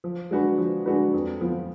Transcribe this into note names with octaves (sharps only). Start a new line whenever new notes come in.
F3
G#3 D4 F#4 B4
F3
G#3 D4 F#4 B4
F2
F3 B3 F4